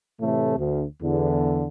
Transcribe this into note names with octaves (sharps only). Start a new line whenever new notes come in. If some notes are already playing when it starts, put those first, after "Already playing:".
A2 C3 E3 A3
D2
E2 D3